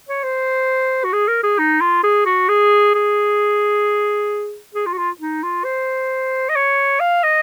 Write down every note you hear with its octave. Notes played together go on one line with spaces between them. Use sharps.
C#5
C5
F#4
G#4
A#4
G#4
D#4
F4
G#4
F#4
G#4
G#4
G#4
F4
F#4
F4
D#4
F4
C5
D#5
C#5
F5
D#5